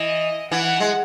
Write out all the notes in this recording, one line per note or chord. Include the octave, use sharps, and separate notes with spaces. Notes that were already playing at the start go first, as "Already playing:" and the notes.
Already playing: E3 D#5
E3 F#5
G#3